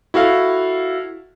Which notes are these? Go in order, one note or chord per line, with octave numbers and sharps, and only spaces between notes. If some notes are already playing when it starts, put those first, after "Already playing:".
E4 F#4 A4 F5